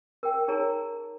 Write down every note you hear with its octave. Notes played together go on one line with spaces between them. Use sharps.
A#4 G5
D#4 G#4 A#4 C#5 A5 A#5